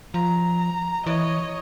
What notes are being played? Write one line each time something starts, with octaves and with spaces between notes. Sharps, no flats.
F3 A#5
E3 C#5 D#5